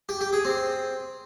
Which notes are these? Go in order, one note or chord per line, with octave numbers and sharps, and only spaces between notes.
G4
G4
G#4
C4